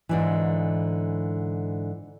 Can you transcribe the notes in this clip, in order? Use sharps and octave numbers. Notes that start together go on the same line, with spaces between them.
G#2 D3 E3